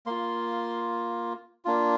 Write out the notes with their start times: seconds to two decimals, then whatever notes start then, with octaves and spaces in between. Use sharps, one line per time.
0.06 A#3 F4 C6
1.65 A#3 D4 F4